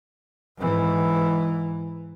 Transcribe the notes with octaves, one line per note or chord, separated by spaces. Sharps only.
G#2 E3